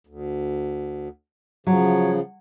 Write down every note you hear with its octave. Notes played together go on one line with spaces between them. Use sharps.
D2
C#3 F3 F#3